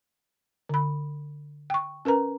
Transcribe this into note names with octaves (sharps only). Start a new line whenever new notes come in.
D3 B5
G5 C#6
C#4 A#4 B4 A#5